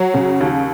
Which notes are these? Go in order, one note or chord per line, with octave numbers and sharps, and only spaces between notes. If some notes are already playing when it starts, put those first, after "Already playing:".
Already playing: F#3
C#3
D#2